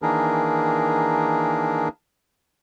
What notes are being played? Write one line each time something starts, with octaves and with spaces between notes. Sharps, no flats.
D#3 E3 A#3 D4 G#4 A#4